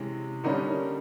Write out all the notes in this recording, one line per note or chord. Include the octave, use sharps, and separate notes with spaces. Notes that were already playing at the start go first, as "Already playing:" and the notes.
Already playing: C3 E3 G#3 C#4
D3 G3 A#3 C#4 D#4
D#4